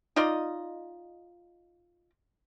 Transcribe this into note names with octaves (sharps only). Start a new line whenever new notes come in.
D#4 F4 D5 D#5